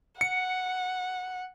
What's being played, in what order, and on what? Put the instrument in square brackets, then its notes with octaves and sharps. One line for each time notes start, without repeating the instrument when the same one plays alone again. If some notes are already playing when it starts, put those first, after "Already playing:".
[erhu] F#5 [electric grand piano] C#7